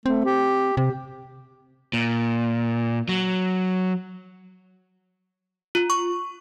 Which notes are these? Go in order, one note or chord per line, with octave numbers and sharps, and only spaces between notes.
A3 C4
G4
C3 G4
A#2
F#3
F4
C#6